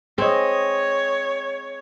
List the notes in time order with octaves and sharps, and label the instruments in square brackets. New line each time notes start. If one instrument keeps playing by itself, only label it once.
[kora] C4 [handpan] G#4 D#5 [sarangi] C#5